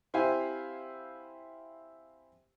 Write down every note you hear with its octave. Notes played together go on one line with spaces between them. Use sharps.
C4 E4 G4 C5 F5 G#5